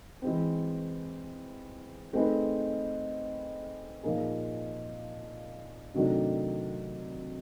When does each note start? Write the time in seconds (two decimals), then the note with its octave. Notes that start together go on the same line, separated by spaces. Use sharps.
0.22 E3 G#3 C4
2.13 A3 C4 D#4 G#4 B4
4.03 A#2 F3 A#3 D#4 G#4
5.94 C3 D#3 F#3 A3 D4